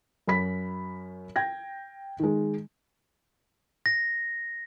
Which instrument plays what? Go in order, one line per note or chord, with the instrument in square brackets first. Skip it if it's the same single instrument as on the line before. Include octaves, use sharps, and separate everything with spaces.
[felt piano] F#2 F#4 B5 B6
G5 G#6 A#6
D#3 G#3
[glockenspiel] A#6